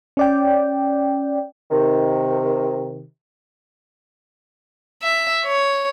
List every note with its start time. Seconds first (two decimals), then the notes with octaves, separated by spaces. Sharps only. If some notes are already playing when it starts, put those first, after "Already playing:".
0.17 C#4 D5 G5
1.71 C3 D#3
5.03 E5
5.45 C#5